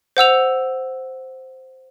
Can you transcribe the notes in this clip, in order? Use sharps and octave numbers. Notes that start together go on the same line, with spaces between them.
C5 F#5 E6 F7